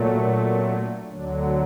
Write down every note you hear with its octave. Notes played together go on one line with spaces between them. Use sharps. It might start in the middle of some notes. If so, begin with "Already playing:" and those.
Already playing: A#2 F#3 A3
D4
C4
D4
D2 D3 F#3 D4